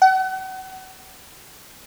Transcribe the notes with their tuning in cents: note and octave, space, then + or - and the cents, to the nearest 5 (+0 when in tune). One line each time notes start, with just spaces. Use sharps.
F#5 +35